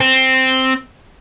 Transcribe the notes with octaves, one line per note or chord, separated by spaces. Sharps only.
C4